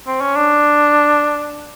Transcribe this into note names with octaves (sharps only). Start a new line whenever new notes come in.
C4
C#4
D4